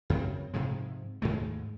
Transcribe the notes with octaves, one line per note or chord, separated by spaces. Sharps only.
F#2 C#3 C4
G#2 C3 F3 G#3
D#2 G#2 G#3 A3